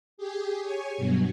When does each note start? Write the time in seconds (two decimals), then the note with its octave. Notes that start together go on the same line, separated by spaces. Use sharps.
0.18 G4 G#4
0.63 C#5 G#5
0.97 G2 B2 F#3